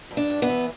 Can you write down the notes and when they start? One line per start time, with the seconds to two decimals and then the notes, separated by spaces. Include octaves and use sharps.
0.11 G2
0.17 D4
0.30 G2
0.42 B3
0.49 E3